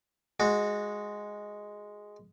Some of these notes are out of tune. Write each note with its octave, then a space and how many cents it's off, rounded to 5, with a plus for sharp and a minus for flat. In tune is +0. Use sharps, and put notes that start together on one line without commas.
G#3 +0 F#4 -15